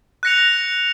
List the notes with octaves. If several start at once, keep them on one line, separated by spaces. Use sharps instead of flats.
F#6 A#6 C#7 F7